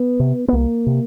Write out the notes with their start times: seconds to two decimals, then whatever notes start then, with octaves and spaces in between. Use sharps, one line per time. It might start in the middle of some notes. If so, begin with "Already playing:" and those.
Already playing: B3
0.20 C3
0.48 B3
0.53 C2 A#3
0.87 C3